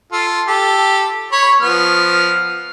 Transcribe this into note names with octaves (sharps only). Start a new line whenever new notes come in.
F4 A4
G4 A4
C#5 B5
F3 B3 F6